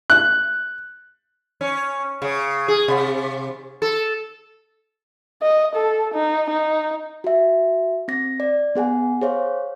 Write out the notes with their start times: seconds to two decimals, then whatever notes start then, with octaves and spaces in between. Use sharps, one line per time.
0.10 F#6
1.61 C#4
2.22 C#3
2.68 G#4
2.88 C3
3.82 A4
5.42 D#5
5.76 A4
6.15 D#4
6.51 D#4
7.24 F#4 E5
8.08 C4 A#6
8.40 D5
8.75 B3 G#4 F#5 G#5
9.22 G#4 C5 C#5 F5